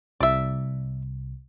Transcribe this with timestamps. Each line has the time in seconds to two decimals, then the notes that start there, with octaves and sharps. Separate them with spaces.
0.21 C2 D5 E5